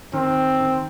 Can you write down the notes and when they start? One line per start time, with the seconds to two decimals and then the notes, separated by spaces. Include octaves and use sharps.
0.13 D#3 C4
0.60 D#3